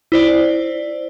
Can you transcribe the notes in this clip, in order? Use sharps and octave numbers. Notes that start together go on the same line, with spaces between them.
E4 C5 D5